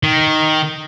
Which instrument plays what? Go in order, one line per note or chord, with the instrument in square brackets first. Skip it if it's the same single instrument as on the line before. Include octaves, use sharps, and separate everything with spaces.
[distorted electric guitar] D#3